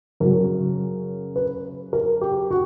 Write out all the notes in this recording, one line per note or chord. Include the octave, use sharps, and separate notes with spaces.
F#2 C#3 F#3 A#4
B4
A#4
G4
F#4